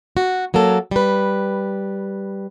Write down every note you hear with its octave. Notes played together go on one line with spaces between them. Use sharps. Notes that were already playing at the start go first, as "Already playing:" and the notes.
F#4
F#3 A#3 C#4 A4
G3 B4